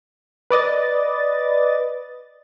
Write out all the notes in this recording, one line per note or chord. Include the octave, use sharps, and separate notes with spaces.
B4 D5 D#5 A6